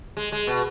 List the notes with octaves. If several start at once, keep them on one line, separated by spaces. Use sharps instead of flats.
G#3
G#3
B2